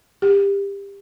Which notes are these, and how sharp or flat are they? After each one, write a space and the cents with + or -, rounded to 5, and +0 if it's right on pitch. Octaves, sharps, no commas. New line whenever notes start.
G4 +25